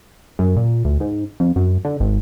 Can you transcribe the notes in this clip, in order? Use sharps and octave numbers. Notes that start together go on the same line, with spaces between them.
F#2
A#2
D2
G#2
F2
F#2
D3
G#1